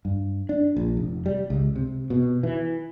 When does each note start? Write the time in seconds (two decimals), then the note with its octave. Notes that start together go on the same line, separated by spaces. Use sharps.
0.05 G2
0.49 D4
0.77 A#1
0.97 F1
1.26 G3
1.50 C#2
1.76 C3
2.10 B2
2.43 E3